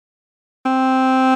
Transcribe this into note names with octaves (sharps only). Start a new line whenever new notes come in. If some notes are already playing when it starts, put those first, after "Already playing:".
C4